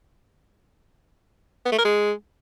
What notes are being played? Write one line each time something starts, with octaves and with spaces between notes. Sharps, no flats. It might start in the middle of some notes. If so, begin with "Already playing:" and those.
B3
A3
A#4
G#3